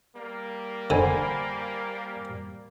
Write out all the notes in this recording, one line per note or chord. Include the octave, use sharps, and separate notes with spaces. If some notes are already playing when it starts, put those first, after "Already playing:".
G3 A#3
D3 C5 G#5 B5